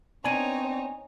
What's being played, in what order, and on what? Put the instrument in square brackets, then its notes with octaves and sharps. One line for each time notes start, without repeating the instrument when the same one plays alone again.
[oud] B3 D4 [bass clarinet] C4 [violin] D#4 C#5 [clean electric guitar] G#5